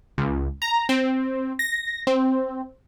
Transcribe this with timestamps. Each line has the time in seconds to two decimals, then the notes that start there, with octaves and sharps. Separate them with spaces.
0.18 C#2
0.62 A#5
0.89 C4
1.59 A#6
2.07 C4